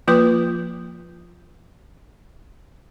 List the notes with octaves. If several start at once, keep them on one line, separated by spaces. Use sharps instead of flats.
F3 A#3 F4 B4 D6